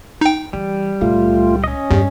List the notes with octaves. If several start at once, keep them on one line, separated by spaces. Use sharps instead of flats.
D#4 G5
E3 G3
C#2 A#2 A3 F4
C#4 D#5
E2 G2 G3